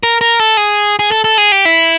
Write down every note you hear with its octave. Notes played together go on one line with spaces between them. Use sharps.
A#4
A#4
A4
G#4
G#4
A4
A4
G#4
G4
E4